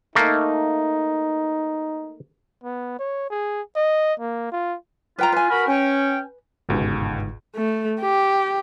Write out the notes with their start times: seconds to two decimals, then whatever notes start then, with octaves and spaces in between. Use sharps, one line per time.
0.15 A3 A#3 D#4
2.64 B3
2.99 C#5
3.30 G#4
3.76 D#5
4.20 A#3
4.52 F4
5.19 F4 B4 G5 A#5
5.32 B4 G#5
5.49 F#4 A#4 B5
5.67 C#4 G5
6.69 G1 C#2 G#2 B2
7.56 A3
8.01 G4